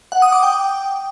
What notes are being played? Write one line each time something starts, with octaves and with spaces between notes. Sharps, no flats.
F#5
D#6
D6
G5